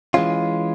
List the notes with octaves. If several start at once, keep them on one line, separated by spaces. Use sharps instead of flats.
E3 G#3 C#4 F4